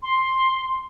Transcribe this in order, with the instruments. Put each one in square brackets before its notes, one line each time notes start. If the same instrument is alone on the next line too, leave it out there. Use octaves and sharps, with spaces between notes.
[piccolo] C6